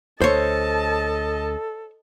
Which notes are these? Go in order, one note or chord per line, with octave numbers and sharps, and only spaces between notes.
D2 A4 C5 C#5 D#5 A5